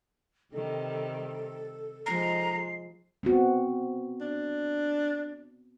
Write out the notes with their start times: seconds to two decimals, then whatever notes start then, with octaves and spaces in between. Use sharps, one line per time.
0.53 C3 D#3 G3 A4
2.06 F3 G#3 D#4 A#5 C7
3.23 B3 C4 F#4
4.21 D4